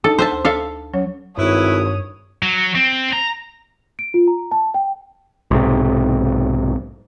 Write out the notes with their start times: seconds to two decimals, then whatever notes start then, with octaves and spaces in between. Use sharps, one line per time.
0.04 D4 D#4 A4 D#5
0.19 C5 E5 A5
0.32 D2
0.45 A4 E5 F5
0.94 F#3 C#4 C#5
1.38 G#1 G2 E4 B4 C#5 D#6
2.43 F#3
2.75 C4
3.13 A#5
3.99 D7
4.14 F4
4.28 A#5
4.52 A5
4.74 G5
5.51 B1 G#2 C3